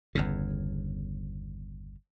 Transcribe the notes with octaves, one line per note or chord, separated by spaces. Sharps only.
G1 E2 C#3